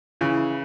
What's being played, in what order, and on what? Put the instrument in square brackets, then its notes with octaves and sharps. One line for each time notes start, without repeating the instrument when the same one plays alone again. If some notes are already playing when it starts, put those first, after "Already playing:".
[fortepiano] C#3 E3 [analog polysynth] E4